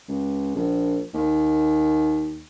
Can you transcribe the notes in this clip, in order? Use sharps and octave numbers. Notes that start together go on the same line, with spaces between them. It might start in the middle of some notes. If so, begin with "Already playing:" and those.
C#2
A#1
D#2